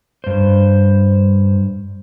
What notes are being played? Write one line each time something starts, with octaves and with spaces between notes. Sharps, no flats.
G2 C5